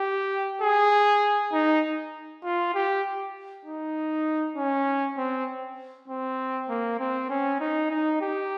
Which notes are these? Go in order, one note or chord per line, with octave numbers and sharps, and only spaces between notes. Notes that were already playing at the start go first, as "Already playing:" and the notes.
Already playing: G4
G#4
D#4
F4
G4
D#4
C#4
C4
C4
A#3
C4
C#4
D#4
D#4
G4